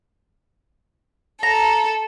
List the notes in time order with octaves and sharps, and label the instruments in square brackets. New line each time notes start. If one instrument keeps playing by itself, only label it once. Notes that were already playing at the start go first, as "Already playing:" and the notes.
[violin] A4 [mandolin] A#5